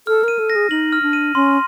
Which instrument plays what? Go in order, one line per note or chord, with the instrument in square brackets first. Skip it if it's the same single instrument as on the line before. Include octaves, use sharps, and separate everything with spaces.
[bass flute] A4 [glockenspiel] F6
[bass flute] A#4 [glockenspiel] D#7
[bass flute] A4
[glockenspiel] A#6
[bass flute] G#4
[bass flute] D#4 [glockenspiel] F#7
[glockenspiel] F6
[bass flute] D4
[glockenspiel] D#7
[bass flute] C#4 [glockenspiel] C6